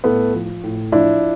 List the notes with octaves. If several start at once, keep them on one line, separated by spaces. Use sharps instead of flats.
A2 A3 B3
F3
A2
F3 D4 E4